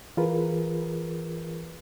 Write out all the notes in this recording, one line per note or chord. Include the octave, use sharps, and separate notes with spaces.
E3 F4 G#4 A#4 B4